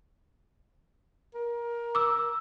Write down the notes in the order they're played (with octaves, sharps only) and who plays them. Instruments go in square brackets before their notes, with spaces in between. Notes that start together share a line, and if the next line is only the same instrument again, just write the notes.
[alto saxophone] A#4
[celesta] D6 E6